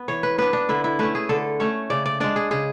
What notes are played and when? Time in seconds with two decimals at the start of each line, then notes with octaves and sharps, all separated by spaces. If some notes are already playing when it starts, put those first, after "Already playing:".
Already playing: B3
0.08 E3 C#5
0.23 B4
0.38 B3 D4 B4
0.53 D4
0.69 D3 E4
0.84 E4
0.99 A3 C#4 B4
1.15 G#4
1.29 D3 A4
1.60 A3 C#4 C#5
1.90 C#3 D5
2.06 D5
2.20 G#3 D4 D5
2.36 G#4
2.51 C#3 G#4